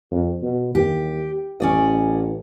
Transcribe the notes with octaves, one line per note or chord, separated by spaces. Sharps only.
F2
B2
D#2 G4
A1 C#4 D5 D#5